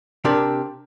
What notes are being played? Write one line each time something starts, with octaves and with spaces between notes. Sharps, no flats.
C3 C4 D4 G4 A#4